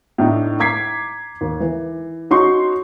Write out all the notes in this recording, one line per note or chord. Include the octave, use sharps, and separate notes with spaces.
A2 D4 D#4
A#5 D6 G#6 B6 C7
D#2
E3
C#4 D#4 F#4 C6 C#6